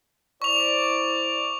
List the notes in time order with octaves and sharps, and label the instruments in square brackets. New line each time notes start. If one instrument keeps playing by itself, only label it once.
[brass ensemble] E4 C5 D5 [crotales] C#6 F7